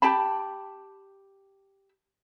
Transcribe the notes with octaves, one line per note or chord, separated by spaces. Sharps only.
G4 G5 A5 B5